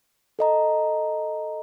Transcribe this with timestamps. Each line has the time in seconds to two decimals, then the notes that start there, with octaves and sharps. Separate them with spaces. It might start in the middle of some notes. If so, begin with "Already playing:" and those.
0.39 A4 D#5 A#5